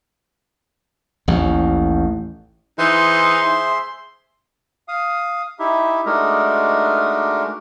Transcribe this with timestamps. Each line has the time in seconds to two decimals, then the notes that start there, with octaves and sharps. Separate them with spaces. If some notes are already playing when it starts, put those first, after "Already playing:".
1.28 A1 D#2
2.79 E3 D#4 G#4 C5 E5 C6
4.88 F5 D#6
5.59 D#4 E4 G4 E5
6.06 G#3 A3 D4 D#4 F#4 A#4